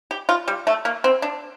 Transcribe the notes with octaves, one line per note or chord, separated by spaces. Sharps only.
G4
F4
G3
A3
A#3
C4
D4